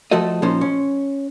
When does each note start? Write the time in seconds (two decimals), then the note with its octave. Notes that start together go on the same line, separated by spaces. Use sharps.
0.11 F3 A3 F#4 A4 D#5
0.42 A#2 F3 C#4 D#4 C5
0.61 C#4